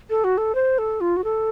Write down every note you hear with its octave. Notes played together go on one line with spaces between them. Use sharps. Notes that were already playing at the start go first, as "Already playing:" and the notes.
A4
F#4
A4
C5
A4
F4
F#4
A4